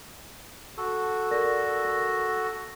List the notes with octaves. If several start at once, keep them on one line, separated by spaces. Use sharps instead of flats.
F#4 A4
A#4 D5 A#6
A#6